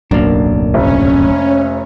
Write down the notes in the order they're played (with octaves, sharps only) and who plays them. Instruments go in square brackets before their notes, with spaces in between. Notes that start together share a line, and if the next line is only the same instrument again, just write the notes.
[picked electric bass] D1 B1 F#2 [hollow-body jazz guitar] A#3 D4
[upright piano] F1 [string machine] C#4